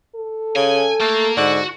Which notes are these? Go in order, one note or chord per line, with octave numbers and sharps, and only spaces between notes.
A4
C#3 G#5
A3 A#3
G#2 D3 F#4